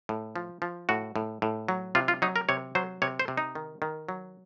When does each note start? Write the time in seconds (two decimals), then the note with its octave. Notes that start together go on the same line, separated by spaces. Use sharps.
0.09 A2
0.36 F3
0.62 F3
0.89 A2 F#4
1.16 A2
1.42 A2
1.68 F#3
1.95 C3 F4
2.08 F4
2.22 F#3 D#4
2.36 A#4
2.49 C3 C#5
2.75 F#3 C5
3.02 C3 C#5
3.19 C5
3.28 C3
3.37 D#4
3.55 D#3
3.82 D#3
4.09 F#3